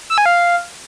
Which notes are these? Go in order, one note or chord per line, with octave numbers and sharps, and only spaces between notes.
E6
G#5
F5